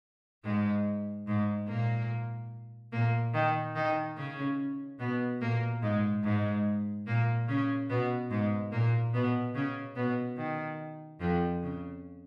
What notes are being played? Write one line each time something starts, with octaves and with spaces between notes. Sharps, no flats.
G#2 G#3
G#2 G#3
A#2 A#3
A#2 A#3
D#3 D#4
D#3 D#4
C#3 C#4
B2 B3
A#2 A#3
G#2 G#3
G#2 G#3
A#2 A#3
C#3 C#4
B2 B3
G#2 G#3
A#2 A#3
B2 B3
C#3 C#4
B2 B3
D#3
F2 F3
C#3